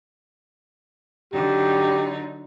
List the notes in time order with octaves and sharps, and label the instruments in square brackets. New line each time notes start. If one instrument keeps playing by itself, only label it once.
[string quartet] D3 F#3 D#4 [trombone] G4